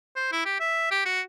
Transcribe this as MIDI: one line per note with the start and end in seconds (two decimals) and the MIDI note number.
0.16 0.29 72
0.32 0.44 64
0.45 0.56 67
0.60 0.91 76
0.91 1.01 67
1.06 1.21 66